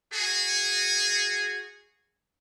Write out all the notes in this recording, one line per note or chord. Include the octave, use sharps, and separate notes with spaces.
F#4 G#4